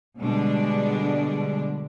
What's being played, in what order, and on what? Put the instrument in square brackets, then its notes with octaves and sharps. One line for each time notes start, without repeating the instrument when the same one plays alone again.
[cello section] B2 D3 G3 G#3 D4